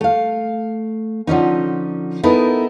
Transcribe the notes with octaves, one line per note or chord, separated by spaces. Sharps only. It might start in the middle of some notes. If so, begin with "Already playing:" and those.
A3 F5
D3 F3 C#4 D#4
B3 D#4 E4 A4 A#4